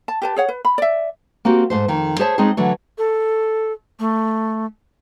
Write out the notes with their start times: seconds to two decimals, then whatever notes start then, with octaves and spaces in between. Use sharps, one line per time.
0.08 A5
0.22 G4 B4 A5
0.36 G#4 C#5 F#5
0.49 B4
0.65 B5
0.78 D5 E5
1.45 A#3 C4 F#4 G4
1.70 G#2 A3 C5
1.88 F2 D#3
2.19 G#4 C5 C#5 E5 A5
2.38 G#3 C4 C#4 D#4 G#4
2.57 D3 E3 F#3 A3
2.98 A4
4.00 A3